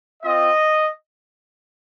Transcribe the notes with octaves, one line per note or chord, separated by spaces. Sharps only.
C4 F4 D#5